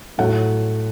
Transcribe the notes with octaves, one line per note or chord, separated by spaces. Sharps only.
A2 F#3 A3 F#5